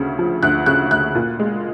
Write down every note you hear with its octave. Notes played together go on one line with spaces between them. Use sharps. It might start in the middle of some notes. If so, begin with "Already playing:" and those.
Already playing: D2 C#3
F3
D2 F#6
C#3 F#6
D2 F#6
A#2
G#3